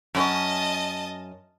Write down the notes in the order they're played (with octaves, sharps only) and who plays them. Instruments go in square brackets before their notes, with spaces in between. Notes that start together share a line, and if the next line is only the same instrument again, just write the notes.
[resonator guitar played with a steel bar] F#2 C#4 [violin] D#5 A5